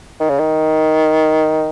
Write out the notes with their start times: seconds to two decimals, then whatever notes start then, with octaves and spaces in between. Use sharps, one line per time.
0.20 D#3
0.29 C#3
0.39 D#3